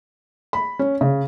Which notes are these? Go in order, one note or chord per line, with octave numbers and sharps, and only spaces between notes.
B5
C#4
C#3